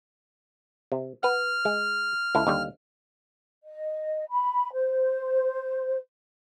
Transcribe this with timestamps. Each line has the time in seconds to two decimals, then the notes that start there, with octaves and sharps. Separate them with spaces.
0.92 C3
1.23 B4 F#5 F6
1.65 G#3
2.35 C#2 E4 A4
2.47 D#2 D3 G3
3.62 D#5
4.30 B5
4.73 C5